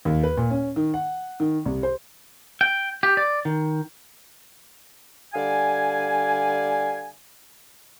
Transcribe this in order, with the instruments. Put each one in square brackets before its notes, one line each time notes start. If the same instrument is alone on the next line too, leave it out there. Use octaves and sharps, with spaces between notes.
[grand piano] D#2
B4
A#2
C#4
D#3
F#5
D#3
C2
C5
[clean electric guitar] G5
G4
D5
D#3
[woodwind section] D3 G3 D5 F5 G#5